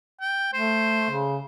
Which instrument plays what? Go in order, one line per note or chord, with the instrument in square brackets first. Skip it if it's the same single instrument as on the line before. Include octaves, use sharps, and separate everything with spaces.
[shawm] G5
[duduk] A3 [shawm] C5
[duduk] C#3